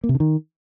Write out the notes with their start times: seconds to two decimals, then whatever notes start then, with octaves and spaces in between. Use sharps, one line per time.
0.04 A#3
0.09 C3
0.15 D3
0.20 D#3